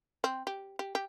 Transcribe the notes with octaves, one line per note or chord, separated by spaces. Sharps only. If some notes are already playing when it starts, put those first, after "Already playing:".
C4
G4
G4
G4